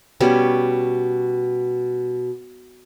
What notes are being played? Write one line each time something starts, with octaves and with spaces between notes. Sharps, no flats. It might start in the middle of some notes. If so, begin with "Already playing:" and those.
B2 G3 C#4